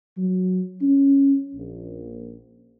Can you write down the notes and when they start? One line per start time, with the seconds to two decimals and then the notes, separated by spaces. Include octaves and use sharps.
0.17 F#3
0.81 C#4
1.55 A#1